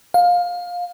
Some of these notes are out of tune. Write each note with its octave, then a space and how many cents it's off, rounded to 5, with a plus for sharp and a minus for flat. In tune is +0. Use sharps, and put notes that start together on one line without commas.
F5 +20